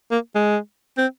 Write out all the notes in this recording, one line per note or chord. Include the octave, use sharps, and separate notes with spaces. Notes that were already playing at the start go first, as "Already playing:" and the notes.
A#3
G#3
C4